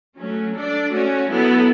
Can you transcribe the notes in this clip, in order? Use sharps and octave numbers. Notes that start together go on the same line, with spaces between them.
F#3 A3 C#4
D4 A4 D5
A3 C#4 F#4
F#3 B3 E4 A4